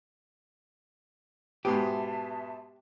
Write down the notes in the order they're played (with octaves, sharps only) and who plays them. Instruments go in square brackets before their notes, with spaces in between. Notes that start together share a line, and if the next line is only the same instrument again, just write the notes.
[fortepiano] G#2 B2 B3 [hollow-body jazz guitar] G4 [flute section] E5 A5